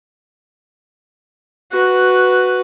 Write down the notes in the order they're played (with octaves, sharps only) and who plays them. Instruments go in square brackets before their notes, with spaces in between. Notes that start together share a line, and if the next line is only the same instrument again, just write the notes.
[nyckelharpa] F#4 B4